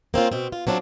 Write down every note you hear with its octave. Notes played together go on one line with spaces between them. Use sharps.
A#3 C4 C#4 F4
B2 C4
F4
F#3 C4 D4 E4 F4